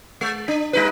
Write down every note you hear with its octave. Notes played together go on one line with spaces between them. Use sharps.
G#3
D4
G3 D#4 B4